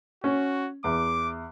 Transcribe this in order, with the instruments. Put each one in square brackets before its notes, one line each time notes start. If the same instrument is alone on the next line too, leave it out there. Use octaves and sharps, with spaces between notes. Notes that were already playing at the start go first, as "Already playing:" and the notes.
[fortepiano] C#4 [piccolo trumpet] F#4
[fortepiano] E2 [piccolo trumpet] D6